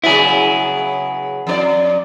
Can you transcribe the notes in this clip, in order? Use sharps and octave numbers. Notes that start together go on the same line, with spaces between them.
C#3 F#3 B3 E4 G#4
F2 D4 D5